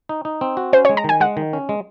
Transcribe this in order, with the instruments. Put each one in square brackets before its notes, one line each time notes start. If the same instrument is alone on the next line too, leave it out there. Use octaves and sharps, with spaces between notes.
[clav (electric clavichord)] D#4
D#4
C4
F#4
[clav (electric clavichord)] C#4 [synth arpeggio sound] C5
[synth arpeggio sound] C#5
[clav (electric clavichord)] G#3
[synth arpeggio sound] A#5
[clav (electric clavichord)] D#3 [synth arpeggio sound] G#5
[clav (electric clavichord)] G#3 [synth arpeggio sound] F#5
[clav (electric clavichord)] D#3
C#4
G#3